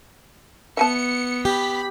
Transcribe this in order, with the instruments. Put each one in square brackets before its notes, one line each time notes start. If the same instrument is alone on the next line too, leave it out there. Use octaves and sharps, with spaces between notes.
[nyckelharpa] B3 [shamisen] E5 G#5 A5 [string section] C#7
[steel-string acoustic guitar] G4 [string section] B5 B6